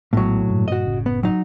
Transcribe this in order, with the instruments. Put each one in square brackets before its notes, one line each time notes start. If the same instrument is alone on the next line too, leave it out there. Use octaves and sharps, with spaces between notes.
[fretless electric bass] A#1 G#3 B3 [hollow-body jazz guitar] A2 F#3
[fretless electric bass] G2 A#2 C#3
[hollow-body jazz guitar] F#4 D#5
[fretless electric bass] F#1 A2 C#3
[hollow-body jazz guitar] B3
F#3 D#4